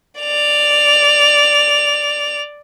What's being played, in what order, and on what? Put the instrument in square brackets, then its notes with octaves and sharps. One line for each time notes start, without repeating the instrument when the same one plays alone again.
[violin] D5 F7